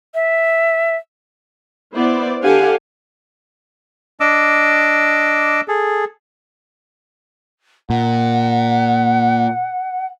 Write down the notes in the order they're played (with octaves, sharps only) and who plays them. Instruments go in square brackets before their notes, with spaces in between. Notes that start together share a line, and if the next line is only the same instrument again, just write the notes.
[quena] E5
[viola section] B3 E4 C5 D5
D3 D4 G4 F5 F#5 G#5
[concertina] D4 D#5 D6 E6
G#4 A4
[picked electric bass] A#2 [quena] F#5